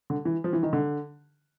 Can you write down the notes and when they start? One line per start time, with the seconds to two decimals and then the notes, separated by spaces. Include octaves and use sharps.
0.10 D3
0.25 E3
0.44 F3
0.53 E3
0.63 D#3
0.73 D3